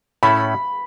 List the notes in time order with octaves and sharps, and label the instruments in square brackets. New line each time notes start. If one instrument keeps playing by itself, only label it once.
[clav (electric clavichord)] A2 A3 C#4 E4 A4 [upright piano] B5